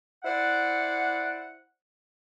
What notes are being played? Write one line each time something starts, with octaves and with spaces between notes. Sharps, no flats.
E4 C5 D5 F#5